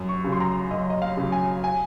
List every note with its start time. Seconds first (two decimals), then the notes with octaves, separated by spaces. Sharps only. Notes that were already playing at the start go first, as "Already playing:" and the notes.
Already playing: F#2
0.09 C#6
0.24 C#3 F#3
0.32 C6
0.40 A#5
0.71 F#2 D#5
0.90 D#5
1.02 F5
1.17 C#3 F#3
1.32 G#5
1.64 G#5